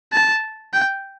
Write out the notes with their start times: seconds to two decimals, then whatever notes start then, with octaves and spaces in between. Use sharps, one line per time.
0.13 A5
0.74 G5